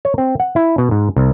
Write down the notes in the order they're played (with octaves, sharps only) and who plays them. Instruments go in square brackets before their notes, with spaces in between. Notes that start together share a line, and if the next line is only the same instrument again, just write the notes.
[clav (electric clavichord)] C#5
C4
F#5
E4
B2
G#2
C2